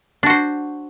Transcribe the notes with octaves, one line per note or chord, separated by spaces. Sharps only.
D4 F#4 C5